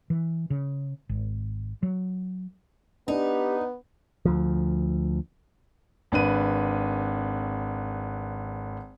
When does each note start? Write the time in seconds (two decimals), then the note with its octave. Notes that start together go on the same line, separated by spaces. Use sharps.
0.10 E3
0.50 C#3
1.09 G#1
1.83 F#3
3.08 B3 D4 D#4 G4
4.25 D2 F3
6.12 G#1 D4 B4 D#7